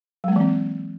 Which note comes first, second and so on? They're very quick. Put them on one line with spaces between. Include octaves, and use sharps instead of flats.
F#3 G#3 A#3 E3 C4